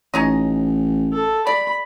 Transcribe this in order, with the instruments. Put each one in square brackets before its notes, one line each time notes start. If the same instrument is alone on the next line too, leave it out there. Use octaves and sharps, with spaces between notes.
[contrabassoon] A1 [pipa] C#4 D#4 D#5
[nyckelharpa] A4
[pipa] D5 [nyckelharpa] B5